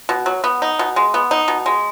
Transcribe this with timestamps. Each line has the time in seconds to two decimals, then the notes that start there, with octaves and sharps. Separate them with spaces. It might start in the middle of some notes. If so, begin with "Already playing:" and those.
0.09 B2
0.26 F#3
0.44 B3
0.62 D#4
0.79 B2
0.96 G#3
1.14 B3
1.31 D#4
1.48 B2
1.66 G#3